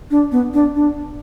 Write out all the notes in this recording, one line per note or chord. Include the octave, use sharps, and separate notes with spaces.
D4
B3
D4
D4